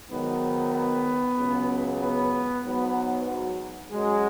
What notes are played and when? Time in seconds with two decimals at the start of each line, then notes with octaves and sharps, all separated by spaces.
0.11 G#2 D#3 F#3 B3
0.74 B3
1.38 C#2 C#3 F#3
2.01 B3
2.65 G#2 F#3 B3
3.28 F#3
3.92 F#2 F#3 G#3